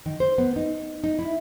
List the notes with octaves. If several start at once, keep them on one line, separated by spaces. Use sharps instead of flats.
D#3
C5
B3
D#4
D#4
E4